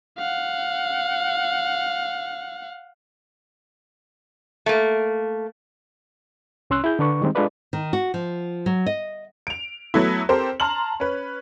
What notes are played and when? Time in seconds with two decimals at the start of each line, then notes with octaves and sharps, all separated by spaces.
0.18 F5 F#5
4.66 A3 A#3
6.70 C2 C#4 C6 E6 F#6
6.84 E4 G#4 G6
6.99 D3 D4 B4 C#6
7.22 D#3 G3 G#3 C4 D#4
7.35 G#3 D4 F4 A4 B4 D5
7.73 D#3
7.93 F#4
8.14 F3
8.66 F#3
8.86 D#5
9.47 D7 F7
9.94 F#3 A3 B3 E4
10.29 C4 G4 A4 A#4 C5
10.60 A5 A#5 C6 F6 F#7
11.00 C#4 B4